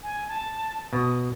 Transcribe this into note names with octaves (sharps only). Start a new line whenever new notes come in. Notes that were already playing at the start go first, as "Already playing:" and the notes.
G#5
A5
B2 D#6